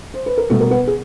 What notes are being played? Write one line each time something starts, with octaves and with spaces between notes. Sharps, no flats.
C5
B4
A#4
B2 G3 A3 A4
A#4
B3 B4
G#4